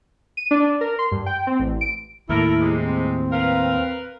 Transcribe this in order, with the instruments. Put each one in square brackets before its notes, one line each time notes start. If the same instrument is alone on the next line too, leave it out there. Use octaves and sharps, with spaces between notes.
[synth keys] D#7
D4
A#4
C6
G2
G5
C4
A1
D7
[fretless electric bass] D#2 A2 [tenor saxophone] E4 [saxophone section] A4 A#4
[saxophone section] C3 G#3
[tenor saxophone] C4
[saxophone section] A#4 B4 [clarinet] F5